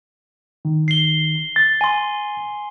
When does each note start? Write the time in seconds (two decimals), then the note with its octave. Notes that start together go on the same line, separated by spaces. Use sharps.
0.65 D#3
0.88 C7 G7
1.56 A6
1.81 G#5 C6